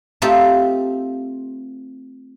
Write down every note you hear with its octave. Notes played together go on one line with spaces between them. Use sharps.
A3 C4 D#4 F4 G4